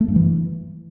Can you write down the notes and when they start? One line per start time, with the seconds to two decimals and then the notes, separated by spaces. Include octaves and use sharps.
0.01 A3
0.08 G2
0.16 E3